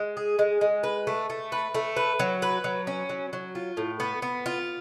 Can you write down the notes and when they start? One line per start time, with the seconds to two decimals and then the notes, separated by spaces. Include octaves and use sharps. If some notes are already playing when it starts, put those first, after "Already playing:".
Already playing: G#3
0.17 G#4
0.39 G#3
0.61 G#3
0.83 B4
1.07 A3
1.30 A3
1.52 B4
1.75 A3
1.96 B4
2.19 F#3
2.42 B4
2.64 F#3
2.87 C#4
3.09 F#3
3.33 F#3
3.55 F4
3.77 A2
4.00 B3
4.22 B3
4.46 F4